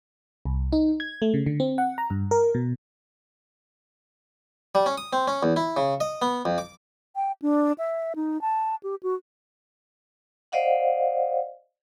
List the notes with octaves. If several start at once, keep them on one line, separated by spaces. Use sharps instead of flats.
C2
D#4
G#6
A3
C#3
D3
C4
F#5
A#5
G2
A#4
B2
G3
C#4
D#6
C4
C#4
E2
E4
C#3
D#5
B3
F2
D6
G5
D4
E5
D#4
A5
G4
F#4
C5 D5 D#5 F5 F#5